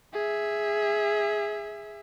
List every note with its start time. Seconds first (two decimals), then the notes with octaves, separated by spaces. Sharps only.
0.13 G#4 E5